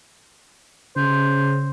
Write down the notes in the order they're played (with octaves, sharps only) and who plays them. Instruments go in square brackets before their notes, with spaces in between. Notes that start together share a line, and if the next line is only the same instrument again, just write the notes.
[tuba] C#3 [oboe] C5